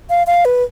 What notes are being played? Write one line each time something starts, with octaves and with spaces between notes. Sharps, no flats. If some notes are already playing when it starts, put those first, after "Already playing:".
F5
F5
B4